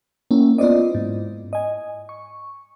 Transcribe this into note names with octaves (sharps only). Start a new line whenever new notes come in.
A#3 C#4 E4
B3 E4 F4 C5 D5 D#5
G#2
D#5 G#5
C#6